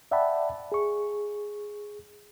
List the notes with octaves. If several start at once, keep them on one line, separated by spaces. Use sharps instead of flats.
D5 E5 F#5 G5 A5 B5
G#4 C#6